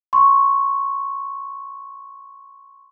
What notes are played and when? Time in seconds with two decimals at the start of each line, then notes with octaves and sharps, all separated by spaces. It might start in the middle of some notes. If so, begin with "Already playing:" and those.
0.13 C6 C#6